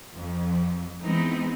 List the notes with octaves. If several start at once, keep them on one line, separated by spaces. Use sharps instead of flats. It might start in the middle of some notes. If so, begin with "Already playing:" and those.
F2
E3 G#3 B3 C4 D#4